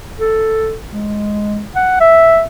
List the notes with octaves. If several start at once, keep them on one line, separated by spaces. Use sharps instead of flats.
A4
G#3
F#5
E5